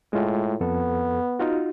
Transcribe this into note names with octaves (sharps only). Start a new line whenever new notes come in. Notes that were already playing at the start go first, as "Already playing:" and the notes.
A2 G#3 F4
F2 B3 A4
D#4 F4 F#4